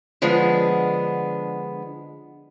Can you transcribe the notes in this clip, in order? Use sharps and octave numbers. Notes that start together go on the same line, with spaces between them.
D3 F3 G#3 B3 D4